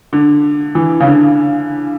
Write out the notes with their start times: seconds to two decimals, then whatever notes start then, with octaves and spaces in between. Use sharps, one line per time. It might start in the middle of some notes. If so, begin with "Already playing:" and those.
0.13 D3
0.75 E3
1.00 C#3
1.06 D3